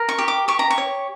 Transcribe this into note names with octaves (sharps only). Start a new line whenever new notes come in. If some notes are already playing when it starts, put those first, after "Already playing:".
Already playing: A#4
C#6
G4
D6
G4 C#6
A#5
C#6
C#5